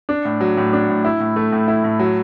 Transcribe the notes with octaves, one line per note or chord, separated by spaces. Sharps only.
D4
A2
F#3
A2
D4
A2
E4
A2
A3
A2
E4
A2
F#3